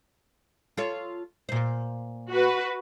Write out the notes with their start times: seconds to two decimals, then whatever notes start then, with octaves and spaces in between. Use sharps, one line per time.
0.77 F4 A4 C#5
1.49 A#2 C5
2.29 F#4 B4